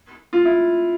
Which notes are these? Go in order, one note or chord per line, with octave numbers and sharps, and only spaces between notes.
F4
E4